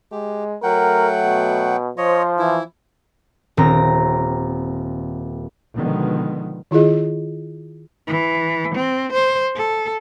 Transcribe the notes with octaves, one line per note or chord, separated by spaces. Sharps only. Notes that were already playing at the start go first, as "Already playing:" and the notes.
G#3 G4
F#3 A3 A#4 F#5 G5
B2
F3 C5 C#5 D#5
E3 E4
D#1 C4 A#5
B2 D3 D#3 F3 G#3 B3
D#3 E4 F4 G#4 D#5
E3
C4
C5
A4